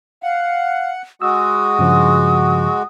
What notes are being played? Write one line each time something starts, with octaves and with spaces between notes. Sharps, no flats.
F5 F#5
G#3 F#4 D#6 E6
G2 C#3 F3